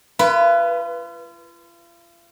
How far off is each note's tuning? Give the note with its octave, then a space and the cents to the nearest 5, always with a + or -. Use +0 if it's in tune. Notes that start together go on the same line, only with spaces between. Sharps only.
F4 -40 B4 +0